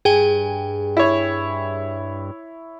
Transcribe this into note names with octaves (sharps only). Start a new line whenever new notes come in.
G2 G#4 G5 G#5
E4 C#5